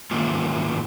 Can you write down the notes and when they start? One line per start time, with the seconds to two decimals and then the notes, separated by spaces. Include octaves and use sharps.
0.11 G#2 D#3 A#3 C#4 F4